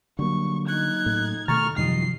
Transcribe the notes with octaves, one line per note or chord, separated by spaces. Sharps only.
D3 F#3 G3 A#3 C#6
D#4 F#6 G#6
A2
B2 D#3 G3 A3 A#5 C#6 F6 A6
F#2 C3 D#3 F3 G3 D#5 C7